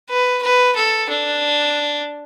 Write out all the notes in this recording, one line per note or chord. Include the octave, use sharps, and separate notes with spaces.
B4
B4
A4
D4